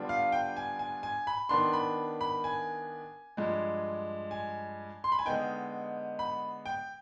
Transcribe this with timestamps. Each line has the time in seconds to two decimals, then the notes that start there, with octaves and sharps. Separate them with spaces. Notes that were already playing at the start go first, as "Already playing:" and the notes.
Already playing: D3 G3 B3 D4 F4
0.09 F5
0.32 G5
0.57 G#5
0.79 G#5
1.03 G#5
1.27 B5
1.49 D#3 B3 D4 C6
1.73 B5
2.21 B5
2.44 G#5
3.37 G2 F3 G#3
4.31 G#5
5.04 C6
5.12 B5
5.19 G#5
5.25 D3 G#3 B3 D#4 G5
6.19 B5
6.66 G5